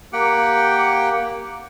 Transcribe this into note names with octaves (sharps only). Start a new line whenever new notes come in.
A#3 G4 F#5 G5